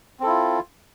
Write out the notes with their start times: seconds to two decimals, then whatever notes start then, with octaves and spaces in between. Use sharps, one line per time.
0.20 C4
0.23 A4
0.26 E4
0.29 F4